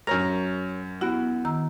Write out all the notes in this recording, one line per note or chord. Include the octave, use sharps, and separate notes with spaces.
F#2 A#4 C#5 A#5 F6
B3 E4 F#4
D#3 A#5 E6